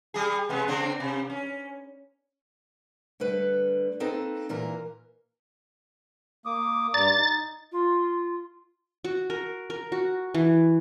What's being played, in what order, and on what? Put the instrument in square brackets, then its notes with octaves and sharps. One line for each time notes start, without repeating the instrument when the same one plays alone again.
[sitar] G3 G#4
C3 G#3 B3
C#3 C4 D4
C3
C#4
[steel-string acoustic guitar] D3 G3 A3 B4
A#3 C4 D#4 A4 B4
A#2 E3 A#3 A#4
[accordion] A#3 D6 D#6
[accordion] G2 D5 A#5 [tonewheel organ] A6
[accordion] D#4
[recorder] F4
[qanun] F#4
A#4
A#4
F#4
E3